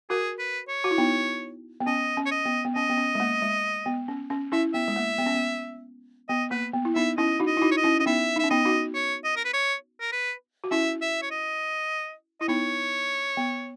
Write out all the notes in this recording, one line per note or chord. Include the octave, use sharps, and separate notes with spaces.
F#4 G#4 A#4
B4
C#5
F#4
E4
B3 D#4
B3
C#4 D#5
C#4
C#5
D#5
B3
B3
C#4 D#5
B3
C#4
G#3
A#3
G#3
B3
C#4
C#4
C#4 E4 E5
B3 E5
G#3
A#3
B3
C#4
B3
B3 D#5
A#3 B4
B3
E4
B3 D#4 E5
C#4 E4 D#5
D#4 F#4
D#5
E4
D#4 F#4
C#5
D#5
C#4 E4
C#4 D#5
B3 D#4 E5
D#4
C#4 E5
B3 D#4 D#5
D#4 F#4
C#5
D#5
A#4
B4
C#5
A#4
B4
F#4
C#4 E4 E5
E5
C#5
D#5
E4 D#5
B3 D#4 C#5
B3